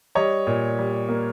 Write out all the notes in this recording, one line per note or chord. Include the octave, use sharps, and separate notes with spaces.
G3 C#5 D#5
A#2
G3
A#3